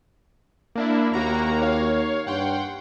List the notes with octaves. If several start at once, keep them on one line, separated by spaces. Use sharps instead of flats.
A#3 D4 E4
D#2 A#3 F#4 A#5
C#5 F5
G2 F#5 G5 C6